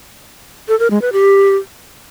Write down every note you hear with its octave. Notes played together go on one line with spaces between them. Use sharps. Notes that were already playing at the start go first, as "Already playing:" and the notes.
A4
A#4
G#3
B4
G4